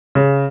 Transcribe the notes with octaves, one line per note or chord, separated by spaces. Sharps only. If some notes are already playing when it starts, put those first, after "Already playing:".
C#3